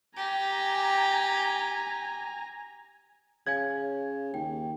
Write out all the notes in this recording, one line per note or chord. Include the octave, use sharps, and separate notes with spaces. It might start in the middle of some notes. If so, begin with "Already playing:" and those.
G4 G#5 A#5
C#3 C#5 F5 G#5 G#6
D#2 G5